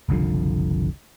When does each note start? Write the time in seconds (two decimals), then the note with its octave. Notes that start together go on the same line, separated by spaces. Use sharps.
0.09 F#1 C2 D3 F3